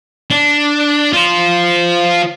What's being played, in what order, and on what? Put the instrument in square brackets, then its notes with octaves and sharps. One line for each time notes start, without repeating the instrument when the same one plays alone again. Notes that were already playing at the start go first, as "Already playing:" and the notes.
[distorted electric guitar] D4
F4 C5